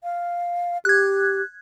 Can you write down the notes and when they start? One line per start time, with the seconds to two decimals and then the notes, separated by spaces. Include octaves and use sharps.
0.03 F5
0.85 G4 F#6 G#6